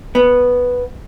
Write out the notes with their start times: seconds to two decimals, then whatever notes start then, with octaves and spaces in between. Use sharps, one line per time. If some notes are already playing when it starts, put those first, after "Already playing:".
0.15 B3